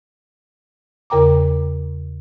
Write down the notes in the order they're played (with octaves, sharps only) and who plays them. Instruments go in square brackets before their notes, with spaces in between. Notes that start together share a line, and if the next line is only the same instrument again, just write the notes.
[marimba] E2 C#3 A#4 G5 A#5 D6